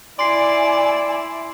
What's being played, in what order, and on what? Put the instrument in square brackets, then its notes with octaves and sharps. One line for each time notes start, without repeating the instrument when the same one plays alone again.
[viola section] E4 [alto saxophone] D5 [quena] G#5 [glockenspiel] C6 C7 D7